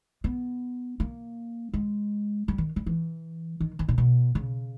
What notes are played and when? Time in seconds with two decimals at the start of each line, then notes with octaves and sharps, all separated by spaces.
0.24 B3
1.00 A#3
1.74 G#3
2.48 G3
2.58 D#3
2.76 G3
2.86 E3
3.61 D#3
3.79 D#3
3.89 A#2
3.98 B2
4.35 C#3